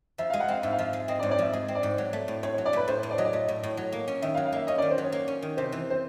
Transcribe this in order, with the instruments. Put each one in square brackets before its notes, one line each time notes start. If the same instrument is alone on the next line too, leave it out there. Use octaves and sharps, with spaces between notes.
[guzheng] F3 [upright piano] E5
[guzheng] G#3 [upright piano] F5
[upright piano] F#5
[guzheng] C4 [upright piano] F5
[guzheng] G#2 [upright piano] E5
[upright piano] F5
[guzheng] F3 [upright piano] E5
[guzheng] G#3
[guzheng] C4 [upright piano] D#5
[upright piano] D5
[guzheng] G#2 [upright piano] C#5
[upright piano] D5
[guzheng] F3 [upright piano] E5
[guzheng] G#3 [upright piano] D#5
[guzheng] C4
[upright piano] D5
[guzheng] G#2
F#3
A3
A2
[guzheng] A2 [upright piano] C#5
[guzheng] F#3 [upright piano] C#5
[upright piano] D5
[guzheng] A3 [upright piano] B4
[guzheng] A2 [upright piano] C5
[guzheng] A2
[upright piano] D5
[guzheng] F#3 [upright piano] D#5
[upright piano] D5
[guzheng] A3 [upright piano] D#5
[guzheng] A2
A2
F#3
A#3
C#4
[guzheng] D#3 [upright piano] E5
[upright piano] F5
[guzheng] F#3
[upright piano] F5
[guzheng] A#3 [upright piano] E5
[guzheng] C#4 [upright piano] D#5
[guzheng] D#3 [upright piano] D5
[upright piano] C5
[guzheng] F#3 [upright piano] C#5
[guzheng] A#3
C#4
D#3
[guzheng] C3 [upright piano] C5
[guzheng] E3
[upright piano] C5